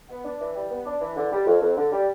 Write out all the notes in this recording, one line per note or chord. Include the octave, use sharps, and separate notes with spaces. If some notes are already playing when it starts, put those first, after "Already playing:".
B3
D4
E3
G3
B3
D4
E3
D3
G3
F2
F2
D3
G3